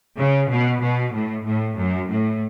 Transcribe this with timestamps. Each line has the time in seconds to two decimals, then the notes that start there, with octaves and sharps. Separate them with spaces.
0.17 C#3
0.49 B2
0.81 B2
1.13 A2
1.44 A2
1.76 F#2
2.09 A2